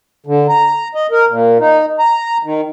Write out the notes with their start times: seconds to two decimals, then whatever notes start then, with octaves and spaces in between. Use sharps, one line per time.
0.26 D3
0.49 A#5
0.95 D#5
1.11 A#4
1.28 A#2
1.60 D#4
1.99 A#5
2.43 D#3